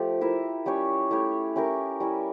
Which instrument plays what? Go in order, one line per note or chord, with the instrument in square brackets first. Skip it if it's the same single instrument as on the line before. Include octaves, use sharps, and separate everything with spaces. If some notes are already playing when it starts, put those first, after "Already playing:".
Already playing: [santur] F3 A3 G4 A4
E4 A#4 E5
G3 C#4 G4 C#5
A3 E4 G4 C#5
C#4 E4 G4 A#4
G3 C#4 E4